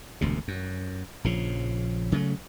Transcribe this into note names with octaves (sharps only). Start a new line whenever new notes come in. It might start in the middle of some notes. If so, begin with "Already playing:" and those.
E1 D2 C3
F#2
A#1 C#3 F3
C#3 F#3 G3 A3